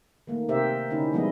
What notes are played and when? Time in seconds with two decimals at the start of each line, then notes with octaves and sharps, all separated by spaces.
0.27 D#3 A3 A#3
0.49 C3 G4 A#4 C5 E5
0.90 D3 C#4 D#4 E4
1.13 F3 G3 G#3 B3 E4 D#5